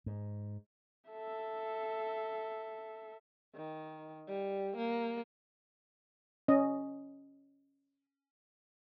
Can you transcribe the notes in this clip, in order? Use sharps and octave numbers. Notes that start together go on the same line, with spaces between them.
G#2
A4 E5
D#3
G3
A#3
C#4 D#5